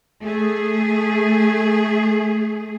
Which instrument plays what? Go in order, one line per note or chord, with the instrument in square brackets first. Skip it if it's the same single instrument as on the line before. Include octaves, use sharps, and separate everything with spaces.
[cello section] A3 G#4